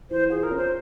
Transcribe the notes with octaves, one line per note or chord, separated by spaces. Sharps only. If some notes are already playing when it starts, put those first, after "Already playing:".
E3 C5
F4 G#4
A#4
C#4
C5